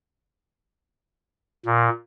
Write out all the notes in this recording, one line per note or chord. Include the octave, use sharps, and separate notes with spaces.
A#2